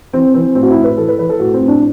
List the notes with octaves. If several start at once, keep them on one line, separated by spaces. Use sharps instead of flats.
E3 C4
E3 C4
A2 C4
F#4
E4
A2
B4
E3 A4
B4
E3 B4
A4
A2 F#4
C4
A2
D4